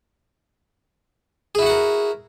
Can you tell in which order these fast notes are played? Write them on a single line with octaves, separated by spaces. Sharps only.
G#4 E4 F#4 F#5 A#4